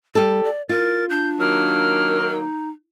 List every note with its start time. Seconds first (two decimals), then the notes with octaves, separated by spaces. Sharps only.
0.15 G3 G4 A4
0.44 D5
0.69 F4 A#4 A6
1.10 D4 G6
1.40 D#3 F#3 A#3 F6
2.28 D#4